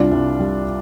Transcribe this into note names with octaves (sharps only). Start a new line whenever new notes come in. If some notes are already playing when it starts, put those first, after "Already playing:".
Already playing: C2 G3 D4 F4
C2
G3